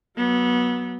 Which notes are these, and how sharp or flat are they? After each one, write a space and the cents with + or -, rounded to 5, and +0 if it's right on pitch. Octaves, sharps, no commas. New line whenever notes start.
F#3 +0 B3 -25